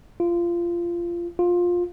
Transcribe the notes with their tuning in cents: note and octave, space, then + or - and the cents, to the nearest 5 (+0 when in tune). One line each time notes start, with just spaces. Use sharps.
F4 -20
F4 +15